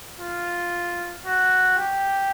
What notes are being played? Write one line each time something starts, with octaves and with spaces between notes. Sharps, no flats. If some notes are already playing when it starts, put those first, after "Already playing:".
F4
F#4
G4